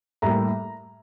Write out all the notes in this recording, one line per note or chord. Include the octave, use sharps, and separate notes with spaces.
A2 G3 A#3 A#5